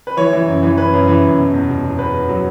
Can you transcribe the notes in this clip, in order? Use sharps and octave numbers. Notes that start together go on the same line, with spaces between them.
B4
E3 C#5
E3
F#2
E3
F#2 B4
F#2
E3
F#2
B2
E2
B2
E2
E2 B4
E2
F#3